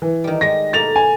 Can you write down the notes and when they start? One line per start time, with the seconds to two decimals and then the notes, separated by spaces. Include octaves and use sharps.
0.02 E3
0.24 D#3 G3
0.41 G3 G#3 A#6
0.73 B2 A3 A#3 A6 F7
0.96 G#5